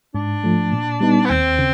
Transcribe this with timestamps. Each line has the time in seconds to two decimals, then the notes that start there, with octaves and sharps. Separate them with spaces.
0.15 G#2 D4
0.44 F3 A3
0.72 A#2
1.01 G3 B3 D#4
1.25 B3
1.30 D#2 C4
1.59 C#3